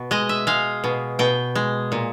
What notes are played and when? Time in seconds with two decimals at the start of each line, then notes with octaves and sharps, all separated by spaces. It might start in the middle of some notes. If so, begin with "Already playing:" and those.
Already playing: B2
0.11 G#3 D#5
0.29 E5
0.47 G#3 F5
0.84 B2
1.19 B2 G5
1.55 G#3
1.92 A#2